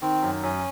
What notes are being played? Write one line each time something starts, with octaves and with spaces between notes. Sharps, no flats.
D#3 C4
F#2
F#2 C#4